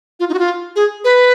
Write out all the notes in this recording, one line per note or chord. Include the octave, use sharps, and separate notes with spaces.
F4
D#4
F#4
F4
G#4
B4